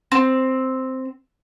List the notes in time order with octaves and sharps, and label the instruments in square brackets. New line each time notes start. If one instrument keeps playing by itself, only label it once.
[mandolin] C4